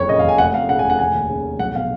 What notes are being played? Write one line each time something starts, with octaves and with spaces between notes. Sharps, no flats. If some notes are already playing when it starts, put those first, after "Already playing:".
Already playing: F#1 F2 C#5
C#3 D#5
F5
F#1 G#5
F1 F#5
F2 F5
C#3 F#5
G#5
F1
F#5
F1 G#5
D#2
C#3
F1
B1 F#5
B2 F5